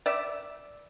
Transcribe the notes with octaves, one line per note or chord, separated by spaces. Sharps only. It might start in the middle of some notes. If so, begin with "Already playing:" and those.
D5 E5